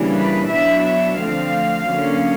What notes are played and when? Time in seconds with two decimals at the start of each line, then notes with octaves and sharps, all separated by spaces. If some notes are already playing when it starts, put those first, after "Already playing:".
Already playing: C#3 E3 G3 A#3 D4
0.16 B4
0.51 B2 F#3 B3 D4 E5
0.85 E5
1.20 D3 F3 A3 C4 F5
1.89 D3 F#3 A#3 C#4